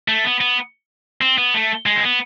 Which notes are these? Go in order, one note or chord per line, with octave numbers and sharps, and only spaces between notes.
A3
B3
B3
C4
B3
A3
G#3
C4
B3